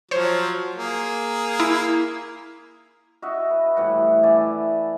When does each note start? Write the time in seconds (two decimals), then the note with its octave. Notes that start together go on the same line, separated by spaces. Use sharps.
0.11 F3 F#3 C5 C#5
0.75 A#3 G#4
1.60 E4
3.22 F#4 D#5 E5 F#5
3.51 B4
3.77 A2 E3 G3 F#5
4.23 A3 E4 D5 G#5